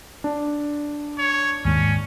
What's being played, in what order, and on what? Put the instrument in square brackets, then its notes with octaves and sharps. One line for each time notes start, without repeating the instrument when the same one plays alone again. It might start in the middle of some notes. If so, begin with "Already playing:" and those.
[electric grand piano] D4
[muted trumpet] C#5
[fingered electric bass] D#2 G#2 [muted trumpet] C#4